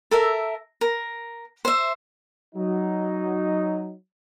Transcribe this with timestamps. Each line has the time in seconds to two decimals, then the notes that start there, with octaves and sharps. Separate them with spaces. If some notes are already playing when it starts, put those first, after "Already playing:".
0.11 A4 A#4 E5
0.81 A#4
1.65 C5 E5
2.55 F#3 D#4